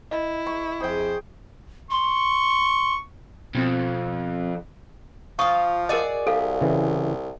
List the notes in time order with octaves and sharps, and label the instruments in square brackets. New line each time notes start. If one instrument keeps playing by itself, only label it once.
[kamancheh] E4 [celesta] D#5
[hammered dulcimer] C#6
[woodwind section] F2 F3 C5 [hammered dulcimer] G#4 G5
[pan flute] C6 [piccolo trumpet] C#6
[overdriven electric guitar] F2 [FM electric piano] B2 C4 F#6
[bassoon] F3 [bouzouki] F4 F5 [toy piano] C#6 D#6
[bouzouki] F#4 G#4 D5 [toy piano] A#4 D#5
[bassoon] C2 [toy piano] A4 F5
[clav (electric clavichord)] C#3 E3